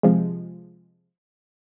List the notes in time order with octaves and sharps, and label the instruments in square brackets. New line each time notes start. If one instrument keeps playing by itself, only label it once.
[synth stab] C3 F3 G#3